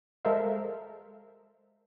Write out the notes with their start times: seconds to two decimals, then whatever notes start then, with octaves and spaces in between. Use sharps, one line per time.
0.25 G#3 A4 A#4 C5 E5 F5